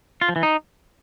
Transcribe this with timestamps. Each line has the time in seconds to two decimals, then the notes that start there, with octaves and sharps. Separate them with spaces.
0.21 F4
0.29 F3
0.36 E3
0.43 D#4